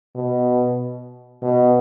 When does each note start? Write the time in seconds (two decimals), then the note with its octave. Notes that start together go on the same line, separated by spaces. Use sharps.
0.16 B2
1.42 B2